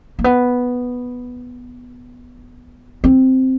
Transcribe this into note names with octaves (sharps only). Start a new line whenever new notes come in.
A#3
B3
C4